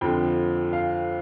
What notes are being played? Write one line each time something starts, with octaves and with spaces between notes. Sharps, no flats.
F2 D3 F3 G5
F5